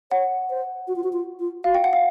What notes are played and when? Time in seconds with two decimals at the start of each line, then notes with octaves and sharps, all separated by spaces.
0.11 C#5 F#5
0.50 C5
0.88 F#4
0.96 F4
1.04 F#4
1.13 F4
1.39 F4
1.64 F#4 F5
1.75 G5
1.84 F#5
1.93 F5